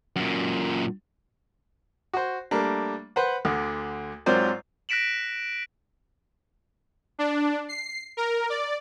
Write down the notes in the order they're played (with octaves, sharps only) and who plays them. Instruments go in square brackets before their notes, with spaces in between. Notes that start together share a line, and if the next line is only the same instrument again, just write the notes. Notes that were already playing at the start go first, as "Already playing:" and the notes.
[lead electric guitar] F#2 A#2
[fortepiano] F#4 C5
G3 A3 A#3 D4
B4 C5 F#5
D2 D3
G#2 F#3 C4 F4 C5 D5
[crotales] F#6 A#6 B6 D7 E7 F#7
[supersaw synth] D4
C7
A#4
D5